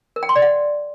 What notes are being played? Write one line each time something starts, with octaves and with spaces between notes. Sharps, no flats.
A#4
G5
C6
D5
F#5